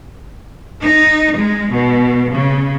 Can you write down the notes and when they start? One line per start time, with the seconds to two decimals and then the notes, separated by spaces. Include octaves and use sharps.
0.83 D#4
1.36 G#3
1.72 B2
2.32 C#3